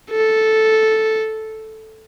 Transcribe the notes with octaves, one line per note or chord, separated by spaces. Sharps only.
A4